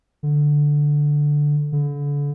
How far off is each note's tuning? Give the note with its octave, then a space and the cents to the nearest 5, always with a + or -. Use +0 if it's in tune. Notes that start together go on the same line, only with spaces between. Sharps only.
D3 +0
D3 -35